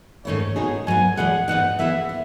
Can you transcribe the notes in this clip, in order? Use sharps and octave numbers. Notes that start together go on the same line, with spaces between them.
G#2 D#3 A3 C#4 E4 C#5
B2 G#3 D#4 G#4
G#2 F#3 B3 G#5
E2 B2 G#3 B3 F#5
G#2 E3 B3 D#4 F#5
E3 B3 E4 G#4 E5
B3